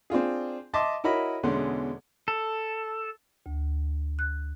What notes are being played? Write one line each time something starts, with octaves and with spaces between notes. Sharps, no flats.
C4 D4 F4 G#4
D#5 E5 A5 C6 D6
E4 F#4 A#4 C#5 D#5 B5
E2 B2 D3 G#3 C#4 C6
A4
D2
F#6